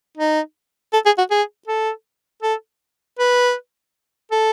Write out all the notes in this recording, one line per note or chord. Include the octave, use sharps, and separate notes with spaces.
D#4
A4
G#4
F#4
G#4
A4
A4
B4
A4